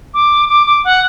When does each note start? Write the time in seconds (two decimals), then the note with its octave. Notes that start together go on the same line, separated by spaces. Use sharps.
0.14 D6
0.49 D6
0.67 D6
0.84 F#5